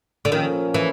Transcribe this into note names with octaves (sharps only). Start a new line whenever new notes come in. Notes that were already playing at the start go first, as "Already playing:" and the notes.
D3
A#2 D#3 F3 A#3 C#4
E3